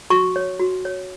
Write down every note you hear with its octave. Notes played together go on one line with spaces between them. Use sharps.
F#4 C#6
C#5
F#4
C#5